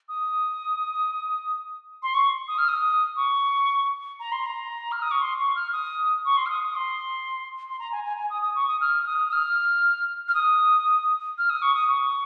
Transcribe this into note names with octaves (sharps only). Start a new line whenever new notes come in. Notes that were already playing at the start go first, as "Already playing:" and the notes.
D#6
C6
C#6
D#6
F6
D#6
C#6
A#5
C6
A#5
F6
D#6
C#6
C6
C#6
F6
D#6
C#6
C6
F6
D#6
D#6
C6
C6
A#5
G#5
G#5
G#5
D#6
D#6
C#6
D#6
F6
F6
D#6
D#6
F6
F6
D#6
F6
D#6
C#6
D#6
C#6